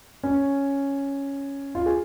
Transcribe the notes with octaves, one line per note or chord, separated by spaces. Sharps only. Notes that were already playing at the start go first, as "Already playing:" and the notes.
C#4
F4
G#4